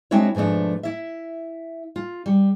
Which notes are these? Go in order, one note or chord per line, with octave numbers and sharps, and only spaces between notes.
G#3 C4 D4 E4 F#4 C#5
G#2 B2 F3 A3 D4
E4 E5
F4
G3